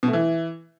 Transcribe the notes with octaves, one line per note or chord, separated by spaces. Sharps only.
B2
A3
E3